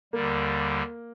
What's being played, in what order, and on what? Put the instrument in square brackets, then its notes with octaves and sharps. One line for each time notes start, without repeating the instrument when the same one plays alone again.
[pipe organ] D#2 D3 G3 [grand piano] A#3